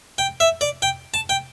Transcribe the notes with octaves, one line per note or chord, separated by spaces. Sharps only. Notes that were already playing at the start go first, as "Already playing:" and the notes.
G5
E5
D5
G5
A5
G5